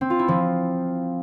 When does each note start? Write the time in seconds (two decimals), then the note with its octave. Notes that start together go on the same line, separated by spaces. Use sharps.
0.01 C4
0.10 F4
0.19 E4
0.28 F3